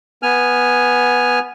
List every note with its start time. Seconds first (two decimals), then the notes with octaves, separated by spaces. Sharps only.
0.23 B3 G#5 F6